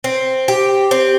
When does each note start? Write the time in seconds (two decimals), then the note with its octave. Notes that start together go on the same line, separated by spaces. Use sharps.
0.04 C4
0.48 G4
0.91 C4